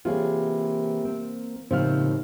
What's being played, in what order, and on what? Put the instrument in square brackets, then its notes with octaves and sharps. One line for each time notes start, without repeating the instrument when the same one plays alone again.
[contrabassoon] C3 [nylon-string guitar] E3 G#4 [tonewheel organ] A#3 [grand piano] F4 C#5
[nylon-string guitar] C4
[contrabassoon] D#2 [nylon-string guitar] A2 F3 C4 [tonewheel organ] C#3 [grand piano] C5 F5 F6